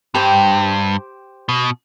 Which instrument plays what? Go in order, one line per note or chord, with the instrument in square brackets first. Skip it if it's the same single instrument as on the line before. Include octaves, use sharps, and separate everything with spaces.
[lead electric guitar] G2 [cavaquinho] G4 C5 G5
[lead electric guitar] B2